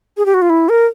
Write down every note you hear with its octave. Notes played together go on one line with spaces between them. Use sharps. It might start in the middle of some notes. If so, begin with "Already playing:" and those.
G#4
G4
F#4
F4
E4
A#4